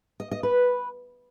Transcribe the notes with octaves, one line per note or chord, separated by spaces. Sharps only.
D#5
D#5
B4